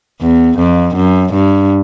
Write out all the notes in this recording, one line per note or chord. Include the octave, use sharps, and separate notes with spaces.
E2
F2
F#2
G2